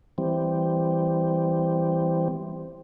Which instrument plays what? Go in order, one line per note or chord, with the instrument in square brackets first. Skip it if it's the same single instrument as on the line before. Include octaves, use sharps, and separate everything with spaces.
[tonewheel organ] E3 G3 C4